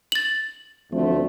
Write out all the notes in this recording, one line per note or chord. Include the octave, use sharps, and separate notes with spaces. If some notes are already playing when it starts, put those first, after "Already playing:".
A6 F#7
D2 F3 A3 C4